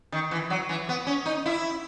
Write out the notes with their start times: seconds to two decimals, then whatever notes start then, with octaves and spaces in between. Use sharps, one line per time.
0.12 D#3
0.31 E3
0.50 F#3
0.69 E3
0.89 B3
1.07 C#4
1.26 D#4
1.46 E4